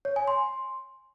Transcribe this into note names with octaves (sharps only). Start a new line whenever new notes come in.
C#5
G#5
C6